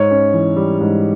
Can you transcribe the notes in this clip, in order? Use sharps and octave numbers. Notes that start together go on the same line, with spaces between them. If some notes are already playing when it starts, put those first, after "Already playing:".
Already playing: G#2 C#5
C#4
E3
G3
G#2